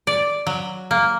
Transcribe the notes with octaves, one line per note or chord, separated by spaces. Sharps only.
D5
F#3
A#3